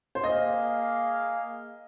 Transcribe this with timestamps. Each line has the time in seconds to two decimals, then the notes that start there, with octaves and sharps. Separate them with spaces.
0.15 C5
0.24 A#3 G#4 D#5 F5